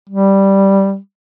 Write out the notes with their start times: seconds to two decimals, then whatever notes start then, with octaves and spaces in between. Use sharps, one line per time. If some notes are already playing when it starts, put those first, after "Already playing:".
0.09 G3